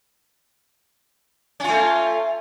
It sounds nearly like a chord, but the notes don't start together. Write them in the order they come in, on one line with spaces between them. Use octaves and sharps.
C#4 F4 A3